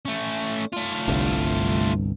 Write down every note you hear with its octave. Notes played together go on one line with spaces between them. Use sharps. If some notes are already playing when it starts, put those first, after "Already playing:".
A3 C#4
A3 F4
G1 C2 G2